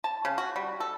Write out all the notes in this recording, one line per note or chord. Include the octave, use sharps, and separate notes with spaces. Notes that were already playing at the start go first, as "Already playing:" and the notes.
A5
C#3
F#4
G3
A4